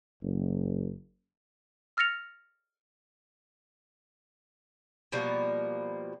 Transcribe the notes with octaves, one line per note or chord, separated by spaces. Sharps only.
F#1
E6 F6 A6 A#6 C#7 F7
B2 F3 G3 A#3